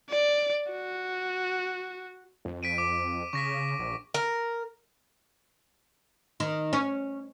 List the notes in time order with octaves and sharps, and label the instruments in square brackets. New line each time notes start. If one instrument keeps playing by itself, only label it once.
[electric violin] D5
F#4
[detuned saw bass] F2
[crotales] B6 D7 D#7
D6
[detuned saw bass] C#3 [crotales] C#6 A#6 B6
[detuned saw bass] A#1
[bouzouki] A#4
[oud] D#3
C#4